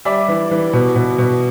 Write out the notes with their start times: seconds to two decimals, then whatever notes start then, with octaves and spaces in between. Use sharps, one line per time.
0.05 G3 D5 E5
0.28 E3
0.51 E3
0.73 B2
0.96 B2
1.18 B2